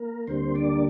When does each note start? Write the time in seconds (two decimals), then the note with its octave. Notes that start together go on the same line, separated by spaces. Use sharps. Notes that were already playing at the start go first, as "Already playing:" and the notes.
Already playing: A#3 A#4
0.27 D2 D3 G3 A#3 C4 C5
0.55 D4 D5